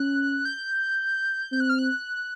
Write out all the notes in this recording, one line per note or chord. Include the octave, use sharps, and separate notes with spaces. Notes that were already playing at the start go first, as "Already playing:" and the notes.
Already playing: C#4 F#6
G6
C4 G6
F#6
F6
F#6